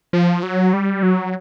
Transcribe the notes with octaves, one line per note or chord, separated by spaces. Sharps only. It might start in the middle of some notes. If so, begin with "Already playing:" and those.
F3
F#3
G3
F#3